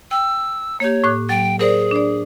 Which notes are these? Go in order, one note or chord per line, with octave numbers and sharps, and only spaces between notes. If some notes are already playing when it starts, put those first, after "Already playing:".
G5 E6
A#3 G4 C#5
A2 D6 F#6
F#3 G5
G#4 A#4 C5 D5
D4 D5